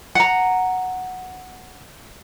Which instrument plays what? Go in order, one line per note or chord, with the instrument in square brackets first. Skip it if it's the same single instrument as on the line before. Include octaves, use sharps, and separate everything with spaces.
[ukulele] F#5 A#5